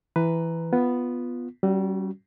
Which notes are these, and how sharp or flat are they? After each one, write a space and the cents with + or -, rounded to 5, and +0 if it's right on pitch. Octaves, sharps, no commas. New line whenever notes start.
E3 +0 B4 +10 A#5 +0
B3 +0 F4 +0
G3 -30 C#4 +0 F#4 +0